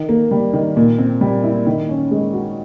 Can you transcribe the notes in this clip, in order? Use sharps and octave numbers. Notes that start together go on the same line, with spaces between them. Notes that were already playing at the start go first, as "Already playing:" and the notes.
Already playing: D#3
A#3
G3
D#3
A#2
C4
G3
E4
D#3
C#4
G#3
F#4